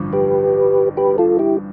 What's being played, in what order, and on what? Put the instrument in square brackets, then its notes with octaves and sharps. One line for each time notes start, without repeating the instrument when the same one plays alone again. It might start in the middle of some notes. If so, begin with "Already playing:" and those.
Already playing: [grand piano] A1 G2 D3 F3
[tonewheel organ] G4 B4
G4 B4
F4 A4
E4 G4